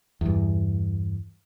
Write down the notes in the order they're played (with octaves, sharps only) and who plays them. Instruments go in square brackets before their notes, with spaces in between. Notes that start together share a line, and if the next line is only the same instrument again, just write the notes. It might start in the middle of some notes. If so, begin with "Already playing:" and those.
[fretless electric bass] E2 G2